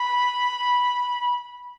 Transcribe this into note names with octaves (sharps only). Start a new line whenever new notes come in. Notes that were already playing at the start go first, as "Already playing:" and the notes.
Already playing: B5